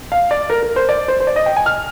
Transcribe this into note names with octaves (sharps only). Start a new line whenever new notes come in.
F5
D5
A#4
A#4
C5
D5
C5
C5
D5
D#5
G5
G#5
F6